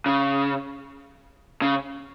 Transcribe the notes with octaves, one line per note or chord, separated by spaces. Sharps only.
C#3
C#3